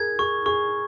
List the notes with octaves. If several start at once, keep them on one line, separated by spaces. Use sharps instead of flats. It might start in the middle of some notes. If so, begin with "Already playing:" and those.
Already playing: G#4 A#4 G#6
G#4 C#6
G#4 C#6